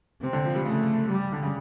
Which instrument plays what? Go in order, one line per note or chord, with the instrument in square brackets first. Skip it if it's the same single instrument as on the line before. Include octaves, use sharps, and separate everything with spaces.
[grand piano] C3 [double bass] C4
[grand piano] D3
F3
G3
[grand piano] C#3 [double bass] A3
[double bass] G3
[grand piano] D3
C#3